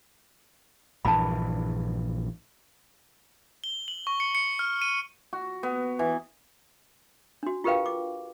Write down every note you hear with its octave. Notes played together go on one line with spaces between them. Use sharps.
A#1 G2 E3 A5 B5
G7
F#7
C#6
C#7
C#7
F6
D#7
F#4
B3
E3
D4 F#4
F4 G4 A#4 B4 F5 G5
D6